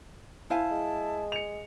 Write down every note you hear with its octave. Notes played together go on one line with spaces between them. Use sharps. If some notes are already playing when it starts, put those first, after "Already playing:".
E4 C5 F5 G#5 A5
G#3
C#7 F7